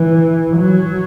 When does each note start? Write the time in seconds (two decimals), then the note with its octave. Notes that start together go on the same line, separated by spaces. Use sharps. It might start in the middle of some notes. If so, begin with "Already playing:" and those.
Already playing: E3
0.56 F#3